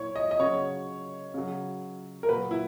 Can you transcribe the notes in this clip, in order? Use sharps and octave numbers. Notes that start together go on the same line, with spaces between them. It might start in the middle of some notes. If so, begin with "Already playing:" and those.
Already playing: A#2 E4 C#5
D#5
D#5
C#3 F#3 C#5
C#3 F#3
A#4
A#2 F#3 B4
E4